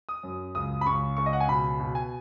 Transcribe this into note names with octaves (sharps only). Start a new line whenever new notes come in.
D#6
F#2
C#2 D#6
B5
C#2 C#6
C#2 C#6
D#5
F#5
G#5
B2 B5
B2
G#5